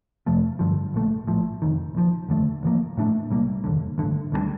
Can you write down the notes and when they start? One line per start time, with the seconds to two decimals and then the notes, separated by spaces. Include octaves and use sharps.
0.26 F2 C3 F3 A3
0.59 G2 D3 F3
0.94 A#1 A#2 A3
1.27 A#1 A2 F3
1.62 F1 F2 D#3
1.95 A#1 A2 F3
2.29 F1 D#2 D3 A3
2.63 A1 A2 F3 A#3
2.97 A2 A3 D4
3.30 C2 A#2 G3 A#3
3.64 F1 D#2 D3
3.98 A1 G2 D3
4.32 D2 D3 G3 D4